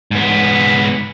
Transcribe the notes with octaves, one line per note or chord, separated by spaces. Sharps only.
G#2 B3